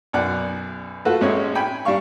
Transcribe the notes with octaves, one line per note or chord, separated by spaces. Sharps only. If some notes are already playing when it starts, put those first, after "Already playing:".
B1 F#2 D5 F#5
A3 F4 F#4 A4 B4
A1 G#3 C4 C#4 C#5
G5 G#5 B5
G3 D4 F5 C#6